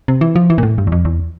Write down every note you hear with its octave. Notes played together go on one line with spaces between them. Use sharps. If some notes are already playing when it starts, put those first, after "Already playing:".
C3
E3
F3
E3
A#2
A2
G2
E2
F2
E2